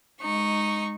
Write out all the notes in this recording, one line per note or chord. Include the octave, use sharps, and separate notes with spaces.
G#3 D#4 C#6